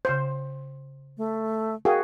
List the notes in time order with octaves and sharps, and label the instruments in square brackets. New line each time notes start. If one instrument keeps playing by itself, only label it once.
[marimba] C#3 C6 G6 [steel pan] C5
[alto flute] A3
[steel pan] F#4 G#4 [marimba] A#4 F5 G5